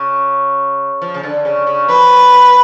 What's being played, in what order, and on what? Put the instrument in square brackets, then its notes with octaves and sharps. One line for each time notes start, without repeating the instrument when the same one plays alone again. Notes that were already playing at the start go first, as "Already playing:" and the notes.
Already playing: [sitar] C#3
F3
C#3
D3
C#3
C#3
[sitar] F3 [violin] B4